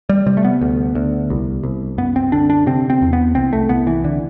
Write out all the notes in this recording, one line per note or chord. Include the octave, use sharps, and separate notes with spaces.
G3
C3 G3
A3
B3
D2
D2
C2
C2
F#2 B3
C4
D3 D4
D4
C3 C4
C4
E2
B3
C2 C4
A3
C2 B3
E3
D3